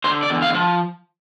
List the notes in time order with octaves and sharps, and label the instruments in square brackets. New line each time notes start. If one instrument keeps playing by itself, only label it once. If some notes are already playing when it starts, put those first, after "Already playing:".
[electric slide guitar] D3 C5
D5
E2
F5
F3